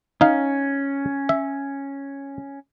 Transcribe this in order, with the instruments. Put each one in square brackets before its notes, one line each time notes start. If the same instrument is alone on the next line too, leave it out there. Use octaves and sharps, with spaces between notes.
[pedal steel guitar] C#4 [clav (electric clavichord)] D#4 F5
[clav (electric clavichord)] E5